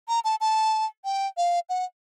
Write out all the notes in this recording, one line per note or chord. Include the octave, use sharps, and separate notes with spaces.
A#5
A5
A5
G5
F5
F#5